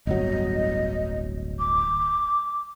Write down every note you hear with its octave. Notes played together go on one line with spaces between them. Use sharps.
D1 G1 F#3 D#5
D6